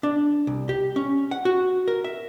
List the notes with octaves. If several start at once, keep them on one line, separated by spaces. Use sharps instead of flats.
D4
C2
G4
C#4
F#5
F#4
A#4
E5